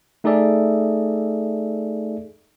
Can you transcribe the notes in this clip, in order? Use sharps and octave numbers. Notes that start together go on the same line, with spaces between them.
A3 D#4 G#4 A4 D5 E5